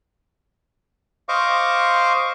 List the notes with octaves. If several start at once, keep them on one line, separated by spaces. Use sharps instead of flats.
C5 D#5 F5 C#6 D6